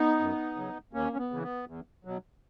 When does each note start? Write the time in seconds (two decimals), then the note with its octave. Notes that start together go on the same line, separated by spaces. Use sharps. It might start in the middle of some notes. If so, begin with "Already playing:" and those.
Already playing: B3 D#4
0.20 F#2
0.56 C#3 F#3
0.93 D#2 A#3 C#4
1.13 C#4
1.18 B3
1.31 C#3 E3
1.43 B3
1.67 E2
2.05 B2 F#3